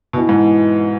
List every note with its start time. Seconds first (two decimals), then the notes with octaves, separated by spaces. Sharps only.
0.13 B2 E3 B3 D#4
0.29 G#2